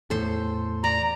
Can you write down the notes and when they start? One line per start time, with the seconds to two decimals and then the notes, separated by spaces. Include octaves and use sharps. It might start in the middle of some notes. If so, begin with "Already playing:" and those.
0.10 E2 A2 A4 C5
0.84 D5 A#5